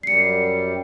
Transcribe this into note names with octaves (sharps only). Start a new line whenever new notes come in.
F#2 G3 C7 C#7